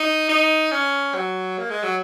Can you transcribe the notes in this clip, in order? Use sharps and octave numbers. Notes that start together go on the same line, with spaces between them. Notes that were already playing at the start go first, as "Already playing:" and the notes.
Already playing: D#4
D#4
C#4
F#3
A#3
G#3
F#3